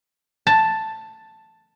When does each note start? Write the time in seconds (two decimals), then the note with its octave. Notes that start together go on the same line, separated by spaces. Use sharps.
0.47 A5